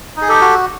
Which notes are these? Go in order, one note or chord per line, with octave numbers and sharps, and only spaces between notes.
D#4
G#4
G4 A4
F#4